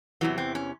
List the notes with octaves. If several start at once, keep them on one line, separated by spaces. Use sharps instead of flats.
E2 C3 E3 F#3
C4
C#4